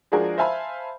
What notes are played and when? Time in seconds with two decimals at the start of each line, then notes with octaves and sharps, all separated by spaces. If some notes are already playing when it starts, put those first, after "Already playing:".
0.12 F3 G#3 D4 F#4 G#4 A#4
0.38 C5 E5 F5 G#5 A5 B5